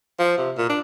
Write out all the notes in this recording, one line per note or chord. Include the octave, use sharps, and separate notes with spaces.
F3
C3
A#2
D4